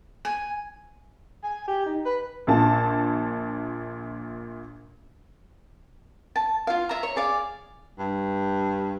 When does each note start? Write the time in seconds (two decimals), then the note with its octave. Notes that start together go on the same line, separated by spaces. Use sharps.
0.25 G#5
1.43 G#5
1.68 G4
1.86 D#4
2.06 B4
2.47 A#1 A#2 A5
6.36 A5
6.67 F4 F5
6.89 E5 A#5
7.03 C#5
7.16 G#4 D5 F5
7.99 G2